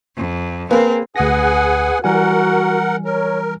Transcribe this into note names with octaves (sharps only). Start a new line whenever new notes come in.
F2
A#3 C4 G#4 A#4 B4
D2 G#4 B4 F#5 G#5 A#6
E3 G3 F#4 A#4 F#5 G#5
A#4 C#5